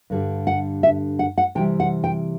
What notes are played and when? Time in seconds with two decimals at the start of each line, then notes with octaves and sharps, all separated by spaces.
0.10 G2 D3 G3
0.47 F#5
0.83 E5
1.19 F#5
1.38 F#5
1.55 C3 E3 G3 G5
1.80 F#5
2.04 G5